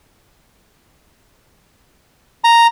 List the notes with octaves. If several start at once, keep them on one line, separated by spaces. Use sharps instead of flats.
A#5